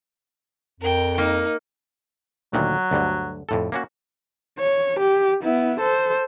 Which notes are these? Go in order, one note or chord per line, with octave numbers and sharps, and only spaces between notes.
F2 A#4 G5
A#3 D#4
D2 A#2 D#3 F#3
D2 G2 D3
F2 A2 A4
A#3 C#4 F#4
C#5
G4
B3 E4
A4 C5